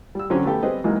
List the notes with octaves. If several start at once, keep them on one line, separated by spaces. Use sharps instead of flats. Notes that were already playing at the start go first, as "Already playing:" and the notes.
G3 E6
D3 F3 F#3 C4 C#4
A3 B3 G4 A4
G3 C4 G#4 B4 D#5
G#2 E3 F#3 A#3 D#4